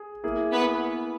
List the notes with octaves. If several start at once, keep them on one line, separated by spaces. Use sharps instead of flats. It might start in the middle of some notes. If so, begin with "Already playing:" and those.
Already playing: G#4
A#3 E4 G#4
B3 B4